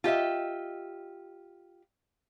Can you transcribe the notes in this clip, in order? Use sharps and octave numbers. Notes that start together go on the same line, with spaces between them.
F4 G4 D#5 E5